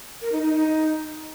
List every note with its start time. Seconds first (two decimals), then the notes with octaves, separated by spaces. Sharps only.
0.22 A#4
0.32 D#4
0.43 D#4
0.53 D#4